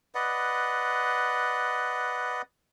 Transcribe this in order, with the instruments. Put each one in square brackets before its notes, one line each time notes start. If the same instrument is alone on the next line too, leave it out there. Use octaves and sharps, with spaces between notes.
[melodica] B4 D5 D#5 F#5